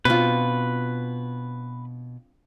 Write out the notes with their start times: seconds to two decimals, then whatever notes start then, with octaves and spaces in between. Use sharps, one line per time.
0.05 B2 C4 D4 F4 B4